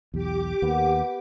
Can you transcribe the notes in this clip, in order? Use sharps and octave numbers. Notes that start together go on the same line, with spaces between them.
B1 E2 G4 D6
D#2 B3